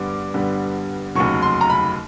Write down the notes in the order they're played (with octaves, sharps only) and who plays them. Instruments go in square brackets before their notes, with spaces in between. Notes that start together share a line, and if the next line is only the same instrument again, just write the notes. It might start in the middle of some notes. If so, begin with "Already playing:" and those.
Already playing: [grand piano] G2 D3 G3 B3 D6
G2 D3 G3 B3
F1 D#2 C#3 F#3 C#6
C6
A#5
B5